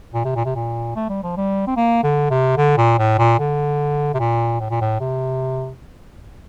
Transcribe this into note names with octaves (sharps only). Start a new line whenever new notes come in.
A#2
C3
A#2
C3
A#2
A3
G3
F3
G3
C4
A#3
D3
C3
D3
A#2
A2
A#2
D3
C3
A#2
A2
A#2
A2
C3